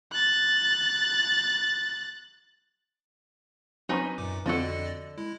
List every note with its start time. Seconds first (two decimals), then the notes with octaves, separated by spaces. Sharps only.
0.12 F#6 A6
3.89 F#3 C4 C#4 D#4 B4 G#5
4.18 F#2 A#2 D6
4.46 F2 D3 F3 C4 F#4 A4 D5 D#5
5.18 G#3 E4